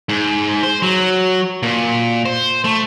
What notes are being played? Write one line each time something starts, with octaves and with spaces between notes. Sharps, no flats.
G#2
C5
F#3
A#2
C5
A3